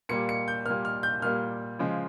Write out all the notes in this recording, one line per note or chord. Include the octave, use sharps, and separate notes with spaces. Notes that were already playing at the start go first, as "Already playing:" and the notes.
A#2 G3 A#3 C#7
C#7
G6
A#2 G3 A#3 F6
F6
G6
A#2 G3 A#3 F6
C#3 F3 G#3